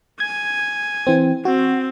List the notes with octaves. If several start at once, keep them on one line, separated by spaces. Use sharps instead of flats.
G#5 G#6
E3 C4
C4 F#4